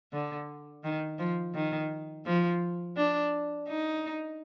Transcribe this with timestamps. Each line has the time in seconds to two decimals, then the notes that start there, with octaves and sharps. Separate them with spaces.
0.13 D3
0.84 D#3
1.19 F3
1.55 D#3
2.26 F3
2.97 D4
3.68 D#4